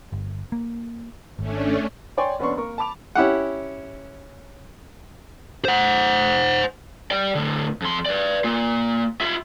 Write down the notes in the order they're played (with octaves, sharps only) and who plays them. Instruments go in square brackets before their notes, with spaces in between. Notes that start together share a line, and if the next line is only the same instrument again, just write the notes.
[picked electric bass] G1
A#3
[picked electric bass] G#1 [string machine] A3 C#4 D4
[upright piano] C#5 D5 G5 G#5 C6 C#6
F1 B3 C#4 D4 C6 C#6
A#3 A#4 C#6
A5 B5 D6 F7
[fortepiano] C#4 E4 G4 F#5
[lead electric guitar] C5 F#5
D5 G5
A2 D3
F2 C6
B4 D5
A#3 F4
F4 E5